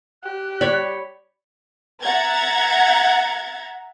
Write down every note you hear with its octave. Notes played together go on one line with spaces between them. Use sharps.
G4 F#6
C#5 D5 B5
E5 F#5 A#5 G#6 A6